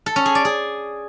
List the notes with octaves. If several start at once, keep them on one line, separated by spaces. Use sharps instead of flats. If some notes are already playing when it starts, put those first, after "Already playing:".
A4
C#4
G#4
D5
G#4